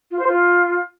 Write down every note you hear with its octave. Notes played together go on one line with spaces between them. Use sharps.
F4
C5
F4